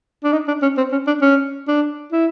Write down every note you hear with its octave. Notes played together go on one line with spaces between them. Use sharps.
D4
D#4
D4
C#4
C4
C#4
D4
C#4
D4
E4